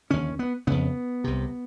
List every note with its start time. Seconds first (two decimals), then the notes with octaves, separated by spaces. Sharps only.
0.10 D#2 D3 C#4
0.39 B3
0.67 F2 C#3 B3
1.24 C2 C3